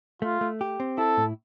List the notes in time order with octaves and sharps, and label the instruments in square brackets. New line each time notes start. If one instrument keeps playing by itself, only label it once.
[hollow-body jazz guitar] A3 [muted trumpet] F4
[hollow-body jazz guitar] A3
G4
C4
[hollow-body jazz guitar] E4 [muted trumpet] A4
[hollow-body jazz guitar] A2